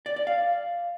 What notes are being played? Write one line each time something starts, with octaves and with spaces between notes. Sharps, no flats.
D5
D5
F5